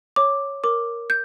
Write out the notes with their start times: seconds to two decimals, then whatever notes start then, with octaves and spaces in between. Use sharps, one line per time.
0.16 C#5 D6
0.64 A#4 D6
1.10 G6